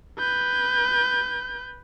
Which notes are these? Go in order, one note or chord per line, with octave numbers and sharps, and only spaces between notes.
B4 G6